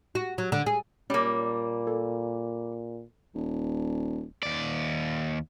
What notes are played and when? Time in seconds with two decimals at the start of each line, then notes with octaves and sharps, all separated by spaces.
0.15 F#4
0.38 F#3
0.52 D3
0.66 G#4
1.10 A#2 G3 A#3 C#4
1.87 A4
3.34 D#1
4.43 D#2 D5